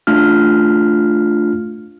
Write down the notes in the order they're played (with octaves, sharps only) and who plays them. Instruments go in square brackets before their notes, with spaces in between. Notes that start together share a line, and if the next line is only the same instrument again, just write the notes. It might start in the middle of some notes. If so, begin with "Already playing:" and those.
[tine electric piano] A3 D4 F4 F6